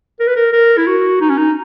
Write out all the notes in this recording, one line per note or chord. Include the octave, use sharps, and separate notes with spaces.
A#4
B4
A#4
A#4
E4
F#4
D#4
C#4
D#4